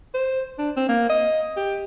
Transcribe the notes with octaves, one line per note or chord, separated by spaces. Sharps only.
C5
D4
C4
A#3
D#5
G4